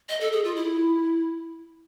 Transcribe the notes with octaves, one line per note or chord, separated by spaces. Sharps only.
D#5
A4
G#4
F4
E4